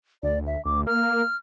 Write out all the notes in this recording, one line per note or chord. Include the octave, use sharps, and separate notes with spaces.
D2 D5
E5
D2 D6
A#3 F6